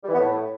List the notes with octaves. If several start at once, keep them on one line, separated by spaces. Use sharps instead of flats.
G3
E3
B3
A2